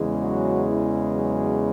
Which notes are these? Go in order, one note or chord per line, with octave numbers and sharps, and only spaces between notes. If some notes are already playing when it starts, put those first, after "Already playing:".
Already playing: E2 C#3 E3 G#3
F#3 F#4
E3 E4
F#3 F#4